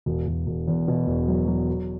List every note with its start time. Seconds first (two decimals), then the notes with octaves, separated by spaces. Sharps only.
0.06 E1
0.27 E1
0.47 E1
0.68 E2
0.88 B2
1.07 E1
1.28 F#3
1.47 F#3
1.68 F#4